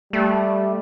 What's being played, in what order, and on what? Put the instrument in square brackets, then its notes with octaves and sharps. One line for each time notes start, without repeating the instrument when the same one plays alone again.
[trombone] G3 [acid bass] A3